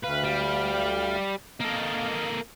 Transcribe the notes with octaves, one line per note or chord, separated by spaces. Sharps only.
D2 B4 F5
G3
A#3 A4 D#5 F5